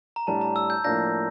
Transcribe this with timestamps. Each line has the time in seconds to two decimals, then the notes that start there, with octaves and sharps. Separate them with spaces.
0.16 A#5
0.27 A2 G3 D4 A5
0.41 A#5
0.56 E6
0.70 G6
0.84 A2 F3 A#3 D4 F4 G6 A#6